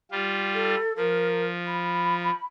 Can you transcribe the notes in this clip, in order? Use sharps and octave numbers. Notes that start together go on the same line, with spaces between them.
G3 F4
A4
F3 A#4
B5